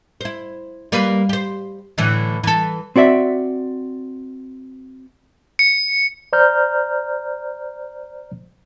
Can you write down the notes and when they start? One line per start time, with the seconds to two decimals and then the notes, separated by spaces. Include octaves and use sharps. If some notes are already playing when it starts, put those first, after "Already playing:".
0.21 E4 C5
0.92 G3 A#3 B4
1.29 G4 C5
1.98 A2 D3 E3
2.43 E3 A4
2.96 C4 F#4 D5 E5
5.59 C#7
6.33 C5 D5 A#5 F6 G6